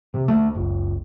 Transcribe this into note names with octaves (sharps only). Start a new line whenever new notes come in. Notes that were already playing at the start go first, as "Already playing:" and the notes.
C3
D2 A3
F#1 C#2